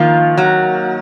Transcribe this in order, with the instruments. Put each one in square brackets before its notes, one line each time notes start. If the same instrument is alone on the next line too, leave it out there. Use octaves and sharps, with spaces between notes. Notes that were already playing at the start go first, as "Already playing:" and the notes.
Already playing: [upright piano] D#3 A#3 [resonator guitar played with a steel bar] F3 F4
[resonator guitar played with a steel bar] F#3 F#4